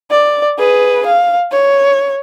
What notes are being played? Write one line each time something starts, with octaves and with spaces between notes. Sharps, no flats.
D5
G#4 B4
F5
C#5